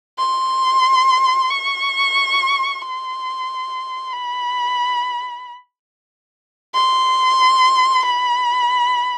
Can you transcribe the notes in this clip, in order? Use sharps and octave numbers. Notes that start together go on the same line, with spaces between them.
C6
C#6
C6
B5
C6
B5